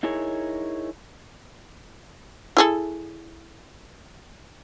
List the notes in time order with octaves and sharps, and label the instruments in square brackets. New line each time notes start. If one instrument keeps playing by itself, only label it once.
[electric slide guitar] D#4 E4 G#4 A#4 C#5
[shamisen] E4 G#4 A4